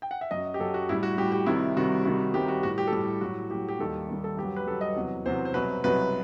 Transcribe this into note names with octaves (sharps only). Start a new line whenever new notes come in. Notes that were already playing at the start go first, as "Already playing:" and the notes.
G5
F#5
E5
F#2 F#3 D#5
G4
F#2 F#3 A4
F#4
A2 G3 E4
F#4
A2 G3 G4
G4
C2 C3 D#3 G3 E4
C2 C3 D#3 G3 F#4
C2 C3 D#3 G3 F#4
C2 C3 D#3 G3 G4
F#4
A2 G3 F#4
G4
A4
A2 G3 G4
A2 F#3 F#4
A2 F#3 G4
G4
D#2 D#3 G3 A4
D#2 D#3 G3
A4
G2 G4
F#3
B4
G2 F#3 A4
D#5
E2 C3 F#3
E2 C3 F#3 C5
C5
C2 B2 F#3 B4
C2 B2 F#3 B4